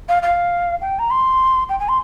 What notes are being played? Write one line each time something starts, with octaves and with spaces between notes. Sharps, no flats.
F5
F5
G5
A#5
C6
G5
G#5
C6